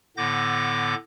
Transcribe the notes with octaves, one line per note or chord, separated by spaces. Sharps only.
A2 D3 B3 D6 G6 A#6